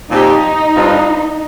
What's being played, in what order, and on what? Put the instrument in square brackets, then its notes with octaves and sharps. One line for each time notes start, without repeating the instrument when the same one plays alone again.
[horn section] A#2 F3 C4 G4 [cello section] D#4
[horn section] G2 G3 C4 F4